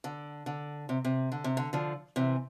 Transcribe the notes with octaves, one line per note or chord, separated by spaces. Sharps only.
D3
D3
C3
C3
D3
C3
D3
D3 F3
C3 E3